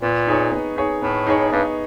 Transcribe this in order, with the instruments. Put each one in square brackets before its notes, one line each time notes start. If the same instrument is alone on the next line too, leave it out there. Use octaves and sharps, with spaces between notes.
[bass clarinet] A#2 [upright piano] B3
[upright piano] D#4 G#4 C#5
B3
D#4 G#4 C#5
[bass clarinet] A2 [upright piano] B3
[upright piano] D#4 G#4 C#5
[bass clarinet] G2 [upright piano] B3